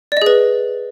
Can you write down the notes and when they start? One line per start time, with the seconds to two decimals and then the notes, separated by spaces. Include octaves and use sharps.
0.12 D5
0.17 D#5
0.22 G#4
0.26 B4